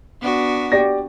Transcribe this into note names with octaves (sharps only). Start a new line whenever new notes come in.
B3 D4 F#4
G4 D5 A#6